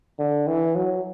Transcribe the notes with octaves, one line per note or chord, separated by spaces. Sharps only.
D3
E3
F#3